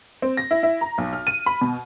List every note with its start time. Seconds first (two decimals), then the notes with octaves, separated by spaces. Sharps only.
0.22 C4
0.37 A#6
0.51 E4
0.63 E4
0.81 A#5
0.98 B1
1.13 F6
1.27 D#7
1.46 B5
1.61 B2